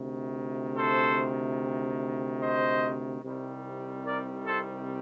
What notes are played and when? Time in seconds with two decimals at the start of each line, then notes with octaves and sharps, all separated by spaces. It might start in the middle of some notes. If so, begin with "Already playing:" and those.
Already playing: D2 C3 D#3
0.74 A4 C5
2.40 C5 D#5
3.22 C2 C3 D#3 G3
4.04 A#4 D5
4.46 A4 C5